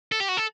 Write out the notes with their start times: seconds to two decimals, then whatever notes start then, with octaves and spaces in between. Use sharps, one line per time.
0.12 A4
0.20 G4
0.29 F#4
0.37 A4